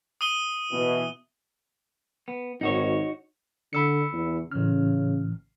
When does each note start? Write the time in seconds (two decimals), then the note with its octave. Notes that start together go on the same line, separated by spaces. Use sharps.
0.21 D#6 D#7 G7
0.72 B2 E3
2.28 B3
2.61 G#1 D#4 F#4 C#5
3.73 D3 B5 E6 C#7
4.12 E2
4.52 A1 C#3 F6